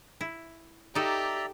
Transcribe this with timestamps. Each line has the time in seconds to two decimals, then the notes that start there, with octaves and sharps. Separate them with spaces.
0.21 E4
0.95 D#4 G4 A4 D5 E5 A#5